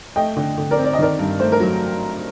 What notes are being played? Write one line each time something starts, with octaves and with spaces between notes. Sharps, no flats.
A3 D#5 G5
D3
D3
A#4 D5
C4
D5
D#5
D#3 A#4 D5
G2
A3 C5
A#4
F#3